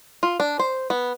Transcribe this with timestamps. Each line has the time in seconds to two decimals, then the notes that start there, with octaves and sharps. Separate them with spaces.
0.23 F4
0.40 D4
0.59 C5
0.90 B3